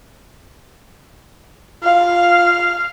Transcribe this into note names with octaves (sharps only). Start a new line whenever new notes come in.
F4 F5